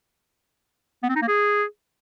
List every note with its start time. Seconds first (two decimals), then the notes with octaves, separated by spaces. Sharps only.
1.03 B3
1.09 C4
1.15 D#4
1.22 A#3
1.28 G#4